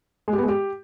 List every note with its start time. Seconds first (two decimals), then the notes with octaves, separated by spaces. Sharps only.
0.28 G#3
0.33 G4
0.38 B3
0.43 G#3
0.48 G4